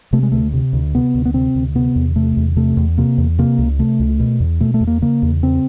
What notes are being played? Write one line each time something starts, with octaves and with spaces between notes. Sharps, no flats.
C3 A3
G#3
D2 A3
C3
D2
C3 B3
D2
B3
C3 C4
D2
C3 B3
E2
C3 A3
E2
C3 A3
E2
C3 A#3
E2
C3 A#3
C#2
C3 A3
C#2
B2
E2
B2 A3
A3
E2
A#3
C#3 A#3
E2
C#3 C4